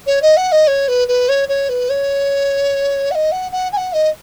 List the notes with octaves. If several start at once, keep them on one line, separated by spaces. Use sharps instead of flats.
C#5
D#5
F#5
D#5
C#5
B4
B4
C#5
C#5
B4
C#5
F#5
D#5
F#5
F#5
G#5
F#5
D#5